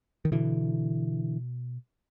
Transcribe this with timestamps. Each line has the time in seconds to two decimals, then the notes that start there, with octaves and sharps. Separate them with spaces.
0.25 D#3
0.32 B2 D3 E3